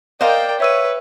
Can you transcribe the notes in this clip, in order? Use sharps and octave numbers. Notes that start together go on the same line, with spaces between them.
A#4 C5 D5 D#5 F5 G5
B4 C#5 E5 E6 D#7